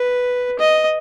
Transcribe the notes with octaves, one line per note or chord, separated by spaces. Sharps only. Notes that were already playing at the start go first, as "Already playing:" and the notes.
Already playing: B4
D#5